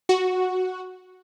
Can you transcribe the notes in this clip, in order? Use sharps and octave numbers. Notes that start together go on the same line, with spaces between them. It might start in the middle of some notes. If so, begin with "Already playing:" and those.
F#4